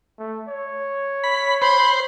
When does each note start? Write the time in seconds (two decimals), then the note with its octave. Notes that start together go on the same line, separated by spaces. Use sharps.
0.19 A3
0.49 C#5
1.24 B5
1.62 C5 B5